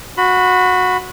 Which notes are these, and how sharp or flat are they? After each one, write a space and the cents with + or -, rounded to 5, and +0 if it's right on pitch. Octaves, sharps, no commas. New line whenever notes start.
F#4 -15 B5 +15